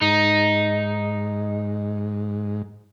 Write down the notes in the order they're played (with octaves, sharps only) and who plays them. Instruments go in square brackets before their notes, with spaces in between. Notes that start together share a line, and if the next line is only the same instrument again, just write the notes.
[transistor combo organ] G#2 [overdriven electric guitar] D#4